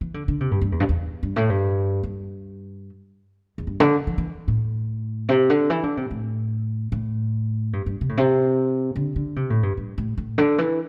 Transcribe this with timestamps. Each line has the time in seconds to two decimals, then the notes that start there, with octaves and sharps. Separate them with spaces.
0.01 E3
0.14 D3
0.28 D3
0.40 C3
0.51 G2
0.61 G2
0.72 E2
0.80 G2
0.89 E2
1.23 G2
1.36 A2
1.50 G2
2.03 G2
3.58 E2
3.67 G2
3.80 D3
4.07 E3
4.18 E3
4.48 A2
5.29 C3
5.50 D3
5.70 E3
5.83 D3
5.97 C3
6.11 A2
6.92 A2
7.73 G2
7.86 G2
8.01 C3
8.09 A2
8.17 C3
8.96 D3
9.16 D3
9.36 C3
9.50 A2
9.63 G2
9.77 G2
9.98 A2
10.17 A2
10.38 D3
10.58 E3